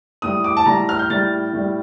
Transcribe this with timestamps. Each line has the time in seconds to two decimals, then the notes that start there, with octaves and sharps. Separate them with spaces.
0.22 A2 G3 D#6
0.44 D6
0.57 A5
0.66 A2 G3 A#5
0.89 F6
0.99 G6
1.09 A2 G3 A6
1.53 A2 G3